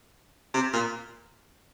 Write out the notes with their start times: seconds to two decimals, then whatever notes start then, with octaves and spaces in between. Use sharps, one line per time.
0.54 C3
0.73 A#2